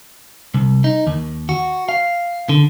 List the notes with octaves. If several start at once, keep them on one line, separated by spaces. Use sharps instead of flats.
C2
D#4
D#2
F#4
F5
D3